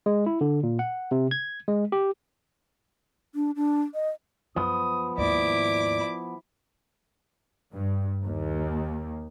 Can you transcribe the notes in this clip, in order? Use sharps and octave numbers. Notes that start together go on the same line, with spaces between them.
G#3
E4
D3
A#2
F#5
C3
G#6
G#3
G4
D4
D4
D#5
F#2 F3 B3 D#6
D#2 G#2 E4 D5 D6
G2
D#2